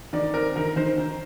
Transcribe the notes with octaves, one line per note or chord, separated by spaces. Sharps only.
D#3 D5
C4 A#4
D#3 A#4
D#3 C5
D#3